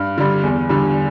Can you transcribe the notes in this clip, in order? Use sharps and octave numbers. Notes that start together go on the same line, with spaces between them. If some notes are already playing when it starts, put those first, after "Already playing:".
Already playing: G2
D3 G3
E2
D3 G3